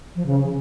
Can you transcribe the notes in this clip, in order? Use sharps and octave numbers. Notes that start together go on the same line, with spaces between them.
F3
C#3